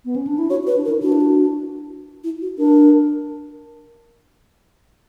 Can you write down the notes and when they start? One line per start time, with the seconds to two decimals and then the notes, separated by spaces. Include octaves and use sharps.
0.05 B3
0.16 C#4
0.27 D4
0.38 E4
0.50 F#4 C#5
0.63 F#4
0.67 B4
0.76 D4
0.85 A#4
0.89 E4
1.02 D4 F#4
1.12 E4
1.21 F#4
2.24 E4
2.42 F#4
2.58 D4 A#4